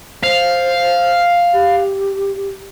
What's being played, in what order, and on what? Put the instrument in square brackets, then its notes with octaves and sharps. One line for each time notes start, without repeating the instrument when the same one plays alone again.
[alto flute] C5 [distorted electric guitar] F5
[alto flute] G4